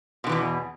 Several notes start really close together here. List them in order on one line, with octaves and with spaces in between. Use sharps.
B2 D3 E3 E2